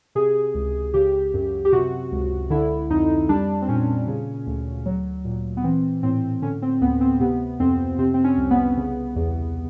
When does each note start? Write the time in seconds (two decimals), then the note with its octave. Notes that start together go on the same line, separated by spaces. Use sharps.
0.15 C3 G#4
0.55 C#2
0.94 C#3 G4
1.34 F#2
1.65 G4
1.73 C3 F#4
2.12 C#2
2.50 D3 E4
2.90 F2 D#4
3.29 G3 D4
3.62 C4
3.68 A#2 C#4
4.07 C#3
4.47 D2
4.86 F#3
5.25 A#2
5.57 B3
5.64 E3 C4
6.03 A2 C4
6.42 D3 C#4
6.62 C4
6.81 D2 B3
7.01 C4
7.20 C3 B3
7.60 F2 C4
7.98 C3 C4
8.14 C4
8.24 C#4
8.38 C2
8.51 B3
8.77 C#3
9.16 E2